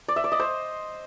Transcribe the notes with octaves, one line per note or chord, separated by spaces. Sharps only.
D5
E5
D5
D#5
C5